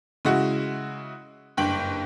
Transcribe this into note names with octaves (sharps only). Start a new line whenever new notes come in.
C#3 G#3 E4 F#4
F#1 G2 G5 F#7